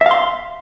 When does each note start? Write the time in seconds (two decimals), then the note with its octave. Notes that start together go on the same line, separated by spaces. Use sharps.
0.01 E5
0.06 F5
0.11 C6